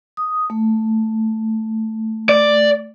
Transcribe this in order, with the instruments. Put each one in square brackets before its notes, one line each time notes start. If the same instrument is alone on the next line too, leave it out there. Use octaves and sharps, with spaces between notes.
[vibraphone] D#6
A3
[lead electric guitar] D5